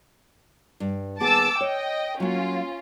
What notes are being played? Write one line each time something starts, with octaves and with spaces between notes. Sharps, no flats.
G2
D#2 B3 G#4 A5 D6 E6
C#5 D#5 G5
F#3 A#3 C#4 F4